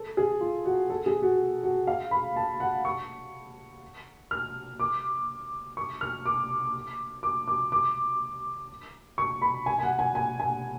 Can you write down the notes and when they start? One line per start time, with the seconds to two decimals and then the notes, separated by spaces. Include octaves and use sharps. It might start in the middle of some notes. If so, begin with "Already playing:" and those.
Already playing: A4
0.17 G#4
0.41 F4
0.65 F#4
0.90 A4
1.06 G#4
1.22 F#4
1.63 F#4
1.87 F5
2.11 B5
2.36 A5
2.60 F#5
2.85 C#6
4.31 F6
4.80 D6
5.77 C#6
6.01 F6
6.26 D6
7.23 D6
7.48 D6
7.72 D6
9.18 C#6
9.42 B5
9.66 G#5
9.79 G#5
9.83 F#5
9.99 G#5
10.15 G#5
10.40 G#5